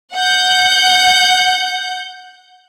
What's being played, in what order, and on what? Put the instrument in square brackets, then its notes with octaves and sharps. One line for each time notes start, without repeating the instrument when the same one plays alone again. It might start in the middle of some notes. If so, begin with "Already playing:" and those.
[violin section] F#5 G6